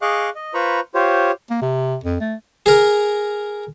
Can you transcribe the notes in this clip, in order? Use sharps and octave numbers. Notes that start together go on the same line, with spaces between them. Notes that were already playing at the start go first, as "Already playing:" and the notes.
G#4 D#5 F5 C#6 D6 F#6
D#5
F4 B4 C5 A#5 B5 C#6
F4 G4 C5 C#5
A#3
C3
F2
A3
G#4 A#4